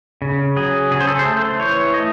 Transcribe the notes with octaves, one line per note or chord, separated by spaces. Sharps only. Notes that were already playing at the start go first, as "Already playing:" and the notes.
C#3
F#3 G#4
C#3 G#4
C5
A4
C5
A3 A4
C5
E3 C#5
A3 D#5